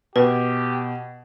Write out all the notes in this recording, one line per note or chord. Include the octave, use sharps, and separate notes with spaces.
B2 G4 B4